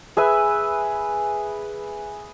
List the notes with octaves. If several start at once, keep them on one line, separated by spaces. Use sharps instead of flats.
G#4 B4 E5 G#5